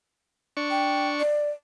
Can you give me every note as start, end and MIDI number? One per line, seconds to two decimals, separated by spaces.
0.57 1.23 62
0.57 1.23 85
0.70 1.08 79
1.20 1.50 74